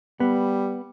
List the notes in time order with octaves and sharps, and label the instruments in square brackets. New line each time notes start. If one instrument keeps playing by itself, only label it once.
[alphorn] G3 [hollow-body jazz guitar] B3